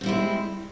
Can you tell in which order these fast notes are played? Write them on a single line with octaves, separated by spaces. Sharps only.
C4 G3 E4 G#3